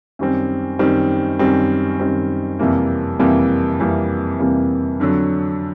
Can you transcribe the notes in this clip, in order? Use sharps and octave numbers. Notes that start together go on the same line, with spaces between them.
F#2 D#3 G3 C4
F#2 D#3 G3 C4
F#2 D#3 G3 C4
F#2 D#3 G3 C4
F2 C3 E3 G3 A#3
F2 C3 E3 G3 A#3
F2 C3 E3 G3 A#3
F2 C3 E3 G3 A#3
F2 D3 F#3